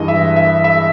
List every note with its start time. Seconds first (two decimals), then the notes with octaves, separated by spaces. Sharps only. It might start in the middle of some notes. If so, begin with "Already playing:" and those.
Already playing: G2 E3 G#3 D#5
0.08 E5
0.36 E5
0.64 E5